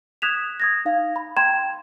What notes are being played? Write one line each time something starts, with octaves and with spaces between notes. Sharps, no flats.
D#6 F#6 G#6 B6 E7 F7
D#6 G#6 A#6
D#4 F5
B5
G5 A#5 C6 G#6 E7